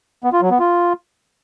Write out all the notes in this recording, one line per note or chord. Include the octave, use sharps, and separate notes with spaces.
B3
F4
F#3
B3
F4